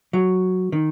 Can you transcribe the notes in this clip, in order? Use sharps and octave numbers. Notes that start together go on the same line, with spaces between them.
F#3
D#3